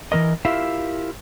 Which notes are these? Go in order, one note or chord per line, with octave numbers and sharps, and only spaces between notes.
E3 G3 A#4 D#5
E4 F4 G4 A#4 E5 F5